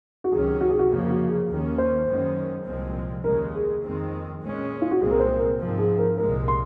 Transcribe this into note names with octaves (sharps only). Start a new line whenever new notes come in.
F#4
C#2 C3 D#3 F#3 C#4 G#4
F#4
G#4
F#4
F2 C#3 F3 A#3
F#4
G#4
D#2 D#3 A#3 C#4
C5
F#2 D#3 G#3 C#4
C2 A#2 F3 G#3 C4
D#2 C#3 G#3 A#4
G#4
F2 D#3 G#3 C4
A#2 G#3 C#4
F4
F#4
C2 A#2 G#3 C4 G#4
A#4
C5
A#4
G#2 F3 C4
G#4
A#4
C2 A#2 G#3 A#4
C6